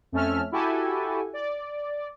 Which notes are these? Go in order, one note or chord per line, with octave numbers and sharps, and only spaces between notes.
F2 A3 C#4 A4 E5 F6
E4 F#4 G4 A4 G#5
D5